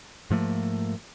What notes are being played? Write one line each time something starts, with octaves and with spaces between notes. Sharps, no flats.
G#2 F3 A3 A#3